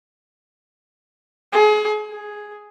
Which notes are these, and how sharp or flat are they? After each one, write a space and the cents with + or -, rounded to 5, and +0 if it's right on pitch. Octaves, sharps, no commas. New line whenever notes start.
G#4 +35
G#4 +5